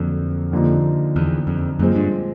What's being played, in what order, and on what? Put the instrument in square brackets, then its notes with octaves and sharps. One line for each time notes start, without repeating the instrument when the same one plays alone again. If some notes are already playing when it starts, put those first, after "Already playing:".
Already playing: [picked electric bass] F2 [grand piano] D3 F#3 A#3
[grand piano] D#2 D3 F3 A#3 D#4
[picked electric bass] E2
F2
[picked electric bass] F#2 [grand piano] A#2 F3 G#3 C4
[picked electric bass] G2